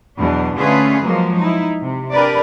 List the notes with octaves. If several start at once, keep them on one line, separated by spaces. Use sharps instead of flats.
E2 B2 F#3 D4
D3 A3 C#4 F4 G#4 B4
F3 F#3 G#3 A#3
D#4 E4
C3
D4 G4 A#4 B4 D5